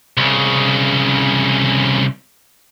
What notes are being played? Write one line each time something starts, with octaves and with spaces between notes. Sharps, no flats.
C2 C#3